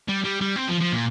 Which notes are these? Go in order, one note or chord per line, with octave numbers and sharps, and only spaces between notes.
G3
G3
G3
C4
F3
F3
A#2